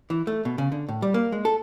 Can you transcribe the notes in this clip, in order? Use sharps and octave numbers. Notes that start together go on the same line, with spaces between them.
E3
A3
B2
C#3
D3
A2
G3
A#3
G#3
A4